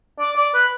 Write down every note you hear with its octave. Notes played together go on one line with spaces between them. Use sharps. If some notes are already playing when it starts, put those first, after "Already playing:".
D5
D5
B4